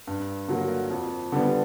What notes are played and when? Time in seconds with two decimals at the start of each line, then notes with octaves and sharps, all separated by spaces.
0.07 G2
0.48 D3 F#3 A#3
0.90 F2
1.32 D3 G3 B3